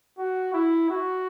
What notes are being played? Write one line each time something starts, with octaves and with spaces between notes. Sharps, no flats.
F#4
E4
F#4